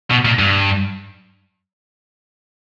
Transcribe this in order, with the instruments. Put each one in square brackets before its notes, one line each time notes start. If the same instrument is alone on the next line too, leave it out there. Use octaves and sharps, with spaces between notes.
[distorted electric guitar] B2
A#2
G2